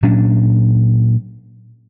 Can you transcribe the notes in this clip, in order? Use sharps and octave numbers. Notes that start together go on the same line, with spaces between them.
A#2 F#3 C#4 D4